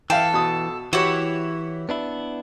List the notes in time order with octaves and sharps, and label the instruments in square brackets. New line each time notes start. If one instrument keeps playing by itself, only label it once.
[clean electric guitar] E3 [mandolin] A4 [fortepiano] E5 F5 G5
[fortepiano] B2 A5 D#6
[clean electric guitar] E3 [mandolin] E4 C#5 [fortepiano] F#4 G4
[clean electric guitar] B3 D4 E4